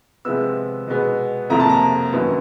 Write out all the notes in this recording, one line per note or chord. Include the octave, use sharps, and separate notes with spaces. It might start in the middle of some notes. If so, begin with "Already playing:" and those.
C3 F3 G#3 B3 E6
B2 G#3 B3
F2 C3 F3 A#3 A#5
A5
A#5
F#2 D#3 F#3 B3